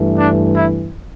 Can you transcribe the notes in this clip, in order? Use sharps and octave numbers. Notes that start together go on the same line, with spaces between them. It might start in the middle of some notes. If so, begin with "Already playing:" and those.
Already playing: G2 E3 A3
D4
E4